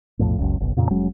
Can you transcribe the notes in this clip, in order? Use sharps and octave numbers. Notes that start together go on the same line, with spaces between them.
B1 F2 A2
F#1 C#2
F#1 B1
F2 A#2 C#3
F1 F#3 G#3 C#4